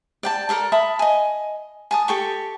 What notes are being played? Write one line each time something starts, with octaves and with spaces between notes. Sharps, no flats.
D5 G5 A5
A4 A#4 D5 A5
E5 A5 B5 D#6
D#5 G#5
G#5 A5 D#6
G4 A4 G5 C#6